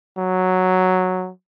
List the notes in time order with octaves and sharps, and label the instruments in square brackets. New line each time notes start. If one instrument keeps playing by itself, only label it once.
[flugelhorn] F#3